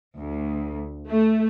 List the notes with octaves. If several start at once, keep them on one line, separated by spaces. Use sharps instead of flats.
D2
A3